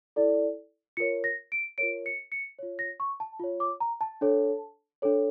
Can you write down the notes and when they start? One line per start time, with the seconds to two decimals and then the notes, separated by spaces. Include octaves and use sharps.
0.16 E4 A4 D5
0.97 F4 A#4 C#5 C#7
1.24 A#6
1.52 D7
1.78 F4 A#4 C#5 D7
2.06 C#7
2.32 C#7
2.59 F4 C#5
2.79 A#6
3.00 C#6
3.20 A5
3.40 F4 C#5
3.60 D6
3.80 A#5
4.01 A5
4.21 D4 A4 C#5
5.02 D4 A4 C#5